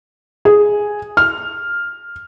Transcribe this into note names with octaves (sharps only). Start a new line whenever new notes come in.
G#4
F6